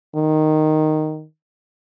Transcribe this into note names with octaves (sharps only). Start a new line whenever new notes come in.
D#3